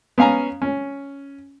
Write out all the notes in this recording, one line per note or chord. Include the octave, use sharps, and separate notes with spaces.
B3 C#4 F5 G#5 A#5
C#4